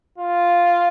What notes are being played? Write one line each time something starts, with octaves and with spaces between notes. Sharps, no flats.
F4